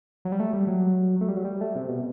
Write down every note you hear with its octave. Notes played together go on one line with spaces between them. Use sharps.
F#3
G3
A3
G3
F#3
A3
G3
F#3
G3
A3
C3
B2